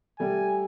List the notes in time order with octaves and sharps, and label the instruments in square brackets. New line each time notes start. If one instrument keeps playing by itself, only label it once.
[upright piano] G3 A3 [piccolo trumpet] G#5